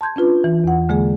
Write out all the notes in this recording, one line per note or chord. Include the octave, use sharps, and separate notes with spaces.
A5 C6 G6 G#6
C#4 D4 F4 B4
E3
E2 F#5
D3 G#3 A#3 G#4